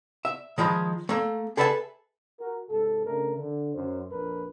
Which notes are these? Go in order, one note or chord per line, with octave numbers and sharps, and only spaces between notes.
E5
D#3 F3 G#3 B5
A3 A#3
G#4 A4 B4 E5 F#5 A5
F#4 A#4
G#2 C3 A4
C#3 A3 D4 A#4
D3
F#2 C5
A#1 F2 D4 A#4 B4